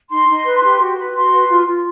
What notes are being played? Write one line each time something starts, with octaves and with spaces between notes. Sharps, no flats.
D#4 C6
D#4
B4
G4
F#4
B4
F#4 C6
B4
F4
F4